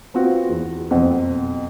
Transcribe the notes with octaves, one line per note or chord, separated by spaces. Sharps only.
B3 C4 F4 F#4
E2
F#1 F2 B2 C4 F#5